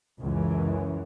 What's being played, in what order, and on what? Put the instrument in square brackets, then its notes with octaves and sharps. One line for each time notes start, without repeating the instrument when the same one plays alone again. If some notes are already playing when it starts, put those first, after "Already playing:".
[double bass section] C#2 F#2 C#3 E3